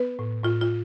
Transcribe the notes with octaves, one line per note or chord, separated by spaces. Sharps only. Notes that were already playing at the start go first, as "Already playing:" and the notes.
Already playing: B3 B4
A2
A2 F4
F4